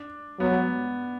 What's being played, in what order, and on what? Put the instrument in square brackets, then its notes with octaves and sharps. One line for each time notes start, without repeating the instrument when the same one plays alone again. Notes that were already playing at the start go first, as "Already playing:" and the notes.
Already playing: [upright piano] D4
[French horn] F#3 [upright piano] B3